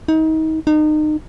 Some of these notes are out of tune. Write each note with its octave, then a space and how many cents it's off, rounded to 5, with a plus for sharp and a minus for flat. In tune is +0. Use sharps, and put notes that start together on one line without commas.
D#4 +30
D#4 -30